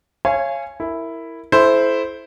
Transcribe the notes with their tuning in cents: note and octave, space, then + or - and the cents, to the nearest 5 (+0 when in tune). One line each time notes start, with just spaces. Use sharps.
C#5 -15 F5 -35 G#5 +0
E4 +0 A#4 -20
E4 +0 A4 -30 C5 -5